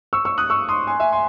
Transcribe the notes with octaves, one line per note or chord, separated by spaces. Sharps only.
C#6 E6
C#6 E6
D#6 F#6
C#6 E6
C6 D#6
G#5 C6
E5 G#5
G#5 C6